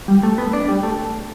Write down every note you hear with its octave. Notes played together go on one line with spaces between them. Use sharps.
G3
A3
B3
D4
G3
A3